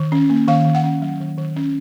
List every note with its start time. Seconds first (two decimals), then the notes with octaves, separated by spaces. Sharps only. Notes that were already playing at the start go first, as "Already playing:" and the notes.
Already playing: D#3
0.12 C#4
0.30 A#3
0.48 D#3 F5
0.65 D#3
0.75 F#5
0.84 C#4
1.02 F#3
1.20 D#3
1.38 D#3
1.56 C#4